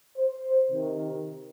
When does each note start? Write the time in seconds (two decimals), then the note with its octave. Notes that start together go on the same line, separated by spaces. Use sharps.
0.17 C5
0.70 C3 D#3